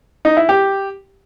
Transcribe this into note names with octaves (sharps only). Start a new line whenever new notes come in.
D#4
E4
G4